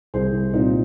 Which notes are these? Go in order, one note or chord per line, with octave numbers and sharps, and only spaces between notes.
C2 G#4 C5
C2
A#2 C4 D#4